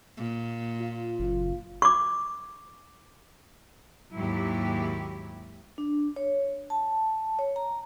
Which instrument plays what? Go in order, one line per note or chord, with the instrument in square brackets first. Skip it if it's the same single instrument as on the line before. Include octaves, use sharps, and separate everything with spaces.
[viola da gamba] A#2
[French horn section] F4
[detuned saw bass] F#1
[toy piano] C#6 D6
[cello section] D#2 G#2 F#3 E4 G4
[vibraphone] D4
C#5
A5
C#5
A#5